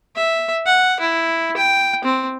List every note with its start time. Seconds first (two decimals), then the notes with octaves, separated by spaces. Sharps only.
0.15 E5
0.66 F#5
1.00 E4
1.57 G5
2.04 C4